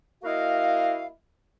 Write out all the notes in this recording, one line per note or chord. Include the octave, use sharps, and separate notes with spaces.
A#3 E4 F#4 D#5 F5